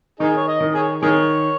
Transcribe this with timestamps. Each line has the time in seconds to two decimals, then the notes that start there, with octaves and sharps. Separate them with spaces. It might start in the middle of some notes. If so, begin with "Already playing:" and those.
0.20 D#3 D#4 G#4
0.37 C#5
0.48 D#5
0.61 D#3
0.74 G#4 C#5
1.03 D#3 G#4 C#5